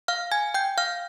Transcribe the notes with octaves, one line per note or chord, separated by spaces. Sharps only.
F5 F6
G#5 G#6
G5 G6
F5 F6